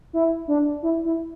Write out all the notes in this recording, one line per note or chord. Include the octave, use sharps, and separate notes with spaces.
E4
D4
E4
E4